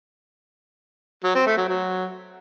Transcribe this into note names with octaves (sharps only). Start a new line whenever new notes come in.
F#3
C4
A3
F#3
F#3